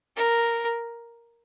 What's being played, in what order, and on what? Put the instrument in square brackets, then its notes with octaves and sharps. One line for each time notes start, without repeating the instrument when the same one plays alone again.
[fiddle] A#4